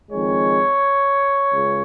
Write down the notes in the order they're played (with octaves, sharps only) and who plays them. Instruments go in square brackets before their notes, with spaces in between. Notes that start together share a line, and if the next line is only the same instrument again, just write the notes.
[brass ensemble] F2 D#3 G#3 C#5
C#2 C#3